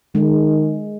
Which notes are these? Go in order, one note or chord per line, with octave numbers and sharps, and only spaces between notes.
D#3 G#3